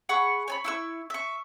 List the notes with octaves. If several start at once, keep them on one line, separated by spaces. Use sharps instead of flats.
G#4 F#5 B5 C#6
C#5 G#5 B5
E4 C#6 E6
E5 C#6